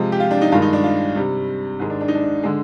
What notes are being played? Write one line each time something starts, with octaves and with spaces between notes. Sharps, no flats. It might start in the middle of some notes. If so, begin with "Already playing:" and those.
Already playing: C3 F3 G#3
G4
F4
D4
D#4
G2 D#3 G#3 F4
D#4
D4
F4
C3 G3
G#2 D#3 G#3
D4
D4
D#4
D4
D3 G#3